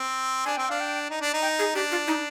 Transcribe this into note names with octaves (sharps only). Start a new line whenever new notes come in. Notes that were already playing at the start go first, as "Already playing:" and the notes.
Already playing: C4
D4 G#5
C4 G5
D4 F5
G5
D#4
D4
D#4
G5
G#4
D4 G4
F4
D#4